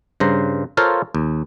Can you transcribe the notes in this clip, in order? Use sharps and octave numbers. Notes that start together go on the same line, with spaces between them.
G2 C#3 C5 A#5
F4 A4 A#4 C5 C#5 F5
D#2